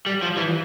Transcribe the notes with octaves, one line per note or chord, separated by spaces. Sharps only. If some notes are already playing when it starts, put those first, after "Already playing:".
G3
F3
E3